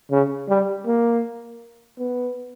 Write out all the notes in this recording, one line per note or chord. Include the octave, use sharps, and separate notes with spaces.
C#3
G3
A#3
B3